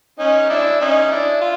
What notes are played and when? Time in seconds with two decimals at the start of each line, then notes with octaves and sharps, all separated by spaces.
0.19 C#4 D#4
0.50 D4 E4
0.80 C#4 D#4
1.11 D4 E4
1.41 F4